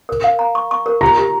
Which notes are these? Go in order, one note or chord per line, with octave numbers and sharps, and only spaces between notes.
A#4
F5
A#5
C#6
C#6
A#4
G4 A#5
G4